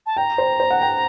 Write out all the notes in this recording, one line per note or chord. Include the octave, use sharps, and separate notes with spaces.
A5
G5 A#5
C5
C5
F#5
G5